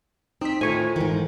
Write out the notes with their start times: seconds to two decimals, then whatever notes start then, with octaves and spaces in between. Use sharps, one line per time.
0.41 C4 D#4 B6
0.61 A2 D#3 F4 A4 C5 G#5 C#6
0.96 G#2 D#3 E3